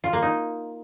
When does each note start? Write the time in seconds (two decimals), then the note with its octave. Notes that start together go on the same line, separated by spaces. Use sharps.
0.04 F4
0.13 A#3
0.22 D#4